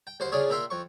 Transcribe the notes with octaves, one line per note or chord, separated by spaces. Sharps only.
G5
D#2 F#4 C5 C6
C#3 D4 F4 G#4 C#5
A#2 A#4 E5 G5 C6
F2 C#6